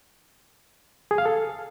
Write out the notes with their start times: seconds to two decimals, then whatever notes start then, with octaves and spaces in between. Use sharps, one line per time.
1.11 G#4
1.18 F5
1.26 A4